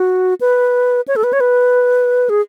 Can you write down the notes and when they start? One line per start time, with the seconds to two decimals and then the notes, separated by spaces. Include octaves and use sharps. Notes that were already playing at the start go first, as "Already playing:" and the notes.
Already playing: F#4
0.41 B4
1.08 C#5
1.16 A4
1.24 B4
1.33 C#5
1.40 B4
2.29 G#4